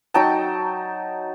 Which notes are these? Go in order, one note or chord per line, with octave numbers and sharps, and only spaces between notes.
F#3 D#4 G5 A5